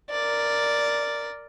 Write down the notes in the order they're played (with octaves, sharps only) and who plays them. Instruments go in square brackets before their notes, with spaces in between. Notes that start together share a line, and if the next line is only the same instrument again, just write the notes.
[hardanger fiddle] A#4 D5